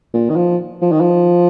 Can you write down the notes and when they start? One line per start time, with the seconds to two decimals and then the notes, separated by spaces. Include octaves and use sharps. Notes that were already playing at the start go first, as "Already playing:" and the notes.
0.14 A#2
0.30 D#3
0.36 F3
0.82 F3
0.92 D#3
1.01 F3